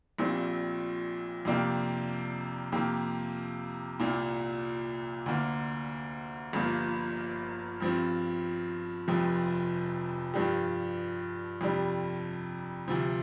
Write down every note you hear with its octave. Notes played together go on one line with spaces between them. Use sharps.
A#1 A#2 G3 C4
F2 C3 A#3 D4 G4
F2 C3 A#3 G4
C2 A#2 A#3
D2 D3 A#3
G1 G2 F3 A#3
G2 F3 C4
F1 F2 C3 F3
G2 F3 D4 G4
F2 C3 G3 D4
D2 C3 F3